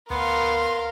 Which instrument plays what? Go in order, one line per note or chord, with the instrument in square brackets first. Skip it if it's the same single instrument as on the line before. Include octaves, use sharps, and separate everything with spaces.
[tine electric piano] D2 [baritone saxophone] B3 [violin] A#4 F5 [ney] C6